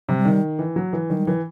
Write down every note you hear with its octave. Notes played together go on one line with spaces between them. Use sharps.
C3 F#3
G3
D#3
E3
F#3
E3
D#3 F#3
G3
E3 F#3